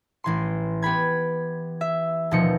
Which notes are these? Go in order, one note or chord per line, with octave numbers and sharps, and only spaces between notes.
A1 E3 C6
B3 G4 B5 G#6
E5
D#1 B2 F3 D#4 C#7